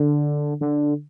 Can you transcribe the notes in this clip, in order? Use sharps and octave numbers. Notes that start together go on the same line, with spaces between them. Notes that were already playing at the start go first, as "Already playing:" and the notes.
Already playing: D3
D3